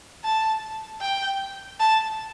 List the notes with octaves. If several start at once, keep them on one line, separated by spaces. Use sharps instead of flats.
A5
G5
A5